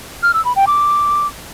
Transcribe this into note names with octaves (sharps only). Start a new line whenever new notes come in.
F6
E6
B5
G5
D6